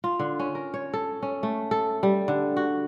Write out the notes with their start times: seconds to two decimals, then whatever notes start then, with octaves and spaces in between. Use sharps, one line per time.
0.04 F4
0.19 D3
0.39 C#4
0.55 A#4
0.74 C#5
0.93 A4
1.22 C#4
1.43 A3
1.71 A4
2.03 G3
2.28 D3
2.57 F#4